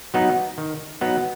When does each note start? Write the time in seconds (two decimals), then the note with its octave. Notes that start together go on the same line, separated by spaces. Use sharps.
0.14 F#3 B3 D#4
0.58 D#3
1.01 F#3 B3 D#4